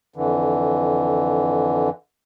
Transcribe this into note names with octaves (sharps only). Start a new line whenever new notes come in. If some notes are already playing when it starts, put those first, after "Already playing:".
F2 D3 E3